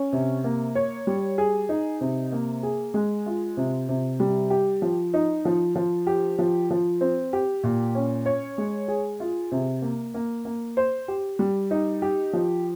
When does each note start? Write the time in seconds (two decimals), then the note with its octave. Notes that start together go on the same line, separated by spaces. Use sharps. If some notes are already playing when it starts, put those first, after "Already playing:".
Already playing: C#4
0.13 C3
0.44 A#3
0.75 C#5
1.07 G3
1.38 G#4
1.69 D#4
2.01 C3
2.32 A#3
2.63 G#4
2.94 G#3
3.26 F4
3.57 C3
3.88 C3
4.20 G3
4.50 G4
4.82 F3
5.14 D#4
5.45 F3
5.75 F3
6.07 G4
6.39 F3
6.70 F3
7.01 C4
7.33 G4
7.63 A#2
7.95 C#4
8.26 C#5
8.58 G#3
8.88 G#4
9.20 F4
9.52 C3
9.82 A#3
10.14 A#3
10.45 A#3
10.77 C5
11.08 G4
11.39 G3
11.71 D#4
12.02 G4
12.33 F3